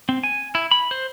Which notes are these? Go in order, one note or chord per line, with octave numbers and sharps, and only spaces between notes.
C4
G#5
E4
B5
C5